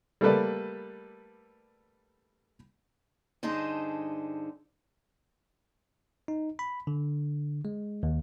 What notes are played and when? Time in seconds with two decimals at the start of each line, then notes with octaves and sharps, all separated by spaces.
0.21 G3 A3 A#3 A4 B4 D5
3.43 G2 D3 D#4 G#4 C5 A5
6.28 D#4
6.59 B5
6.87 D3
7.65 G#3
8.03 D#2